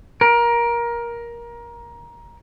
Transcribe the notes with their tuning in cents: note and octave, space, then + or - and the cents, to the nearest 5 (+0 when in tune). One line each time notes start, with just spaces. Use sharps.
A#4 +20